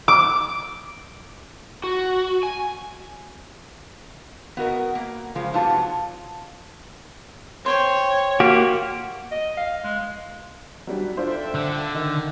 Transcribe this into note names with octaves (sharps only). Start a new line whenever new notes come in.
D6
F#4
G#5
B3 F#4 A#4 D#5
A#3
C#3 F3 G#3
G#2 C3 F#3 B3 F4 A5
C5 C#5 G5 C6
A#3 F#4 G4
D#5
F5
G#3
F#3 G3 D4
D4 F4 A4 C5 E5 G5
D3
D#3